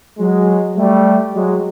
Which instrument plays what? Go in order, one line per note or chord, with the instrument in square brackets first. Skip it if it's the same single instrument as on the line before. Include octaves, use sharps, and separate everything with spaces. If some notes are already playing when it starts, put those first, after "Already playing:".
[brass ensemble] F#3 G#3
G3 A3
F#3 G#3